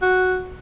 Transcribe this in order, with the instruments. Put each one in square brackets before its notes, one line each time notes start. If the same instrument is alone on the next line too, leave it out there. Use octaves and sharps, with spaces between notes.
[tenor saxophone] F#4